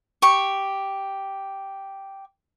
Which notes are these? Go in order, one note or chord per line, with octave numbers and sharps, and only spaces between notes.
G4 C#6